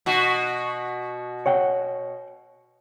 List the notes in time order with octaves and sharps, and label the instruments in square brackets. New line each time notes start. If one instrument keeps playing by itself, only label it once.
[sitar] B2 F#4
[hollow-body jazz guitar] C#5 F#5 G5